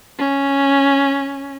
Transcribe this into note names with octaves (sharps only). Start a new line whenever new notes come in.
C#4